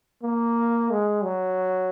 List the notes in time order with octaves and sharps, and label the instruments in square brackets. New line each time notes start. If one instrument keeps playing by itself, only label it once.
[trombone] A#3
G#3
F#3